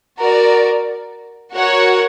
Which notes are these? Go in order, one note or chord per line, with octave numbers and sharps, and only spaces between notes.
F#4 A#4 D5
F#4 A#4 C#5 F#5